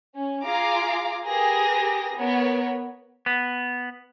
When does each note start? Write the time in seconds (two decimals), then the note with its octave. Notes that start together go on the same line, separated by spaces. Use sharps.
0.15 C#4
0.44 F4 G#4 F5 A#5 D6
1.25 G4 G#4 A#4 B4 D#6 A#6
2.16 B3 A#4 C#5
3.26 B3